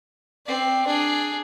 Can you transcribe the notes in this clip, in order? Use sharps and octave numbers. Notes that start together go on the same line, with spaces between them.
C4 D5
D4 G#4